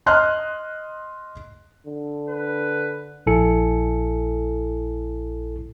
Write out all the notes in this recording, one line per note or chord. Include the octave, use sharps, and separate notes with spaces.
D#5 C6 F6 F#6
D3
B4
A#1 E4 A4 G#5 C#7